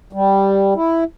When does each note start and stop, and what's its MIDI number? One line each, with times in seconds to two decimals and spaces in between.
0.13 0.74 55
0.75 1.04 64